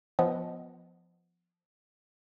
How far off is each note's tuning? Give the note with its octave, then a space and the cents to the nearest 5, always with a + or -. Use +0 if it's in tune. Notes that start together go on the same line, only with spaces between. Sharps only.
F3 +0 B3 +0 D#5 +0